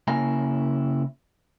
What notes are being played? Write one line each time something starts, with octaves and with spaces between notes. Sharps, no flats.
C#3 A#3 E4 G#5 A#5